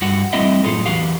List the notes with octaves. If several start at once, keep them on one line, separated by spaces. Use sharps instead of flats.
G2 F#4
G3 A3 C4 E4 D#5 E5
F#2 A2 F4 G#4 A4
E2 F#4 G4 F5